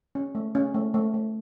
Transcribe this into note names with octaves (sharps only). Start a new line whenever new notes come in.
C#4
A3
C#4
A3
A3
A3